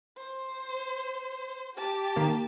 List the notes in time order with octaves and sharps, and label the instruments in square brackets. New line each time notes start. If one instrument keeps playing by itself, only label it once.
[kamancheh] C5
G4 A5
[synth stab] D#3 A#3